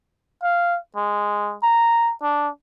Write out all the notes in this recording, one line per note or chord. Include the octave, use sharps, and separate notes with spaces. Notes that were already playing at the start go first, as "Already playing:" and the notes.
F5
G#3
A#5
D4